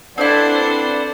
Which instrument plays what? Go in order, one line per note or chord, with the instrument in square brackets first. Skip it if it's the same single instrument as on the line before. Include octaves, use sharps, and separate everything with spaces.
[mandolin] C4 E4 [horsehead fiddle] D4 [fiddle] A4 C5 [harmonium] B4 D5 F#5